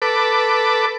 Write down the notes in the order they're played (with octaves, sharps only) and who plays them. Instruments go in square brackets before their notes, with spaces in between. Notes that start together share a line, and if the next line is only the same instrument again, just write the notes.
[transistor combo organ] A4 B4 D6